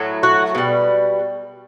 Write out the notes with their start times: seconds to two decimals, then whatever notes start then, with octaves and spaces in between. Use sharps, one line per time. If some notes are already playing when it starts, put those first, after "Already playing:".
Already playing: A2 F#3 A3
0.23 F#4
0.55 B2 G3